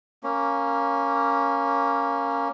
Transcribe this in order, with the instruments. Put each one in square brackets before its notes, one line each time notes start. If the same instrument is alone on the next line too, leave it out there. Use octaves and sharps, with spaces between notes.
[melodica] A#3 C#4